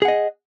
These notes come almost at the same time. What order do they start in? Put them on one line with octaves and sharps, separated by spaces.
G#4 F#5 D#5